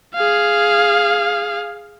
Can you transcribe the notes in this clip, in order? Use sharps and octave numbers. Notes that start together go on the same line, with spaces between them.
G#4 F5